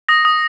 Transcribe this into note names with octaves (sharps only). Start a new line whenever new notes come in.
D#6 A#6
D#6